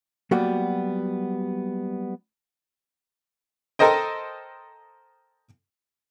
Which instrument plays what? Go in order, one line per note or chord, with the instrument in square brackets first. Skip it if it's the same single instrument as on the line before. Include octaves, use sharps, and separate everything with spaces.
[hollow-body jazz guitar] F#3 G3 A#3 B3 F#4
[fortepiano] A4 A#4 C5 D#5 G5